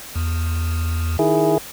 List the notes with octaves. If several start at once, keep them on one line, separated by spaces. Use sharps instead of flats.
E2
D#3 E4 G#4